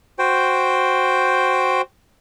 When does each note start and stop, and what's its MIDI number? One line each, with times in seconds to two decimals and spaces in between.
0.19 1.81 66
0.19 1.81 72
0.19 1.81 79